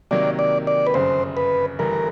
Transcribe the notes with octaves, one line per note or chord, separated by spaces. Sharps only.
C3 D#3 F#3 A#3 D5
D5
D5
B4
G1 F#2 C#3 C5
B4
G1 G2 E3 A3 A#4